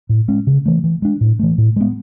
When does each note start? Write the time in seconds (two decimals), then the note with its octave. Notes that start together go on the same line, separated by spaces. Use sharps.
0.09 A2
0.28 G#3 C#4
0.47 C#3
0.66 E3 A3
0.84 E3
1.02 G#3 D4
1.21 A2
1.39 E3 A3
1.58 A2
1.76 G#3 B3